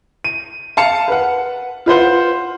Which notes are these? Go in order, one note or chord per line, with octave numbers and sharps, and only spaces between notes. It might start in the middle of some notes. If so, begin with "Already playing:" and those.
D#7
F5 A5 C#7
B4 F#5
F4 B4 C5 F#5